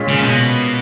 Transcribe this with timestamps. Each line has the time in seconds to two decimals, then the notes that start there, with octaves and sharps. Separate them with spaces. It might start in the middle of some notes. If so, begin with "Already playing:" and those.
Already playing: A#2 G#3 C#4
0.08 C#3
0.23 B2